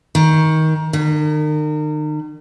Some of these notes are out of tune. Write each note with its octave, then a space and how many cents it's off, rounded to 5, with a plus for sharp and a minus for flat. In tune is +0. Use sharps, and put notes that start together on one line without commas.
D#3 +20
D#3 -40